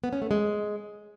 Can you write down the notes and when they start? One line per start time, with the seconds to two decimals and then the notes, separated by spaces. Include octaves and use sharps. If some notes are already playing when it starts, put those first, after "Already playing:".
0.04 B3
0.13 C#4
0.22 A3
0.31 G#3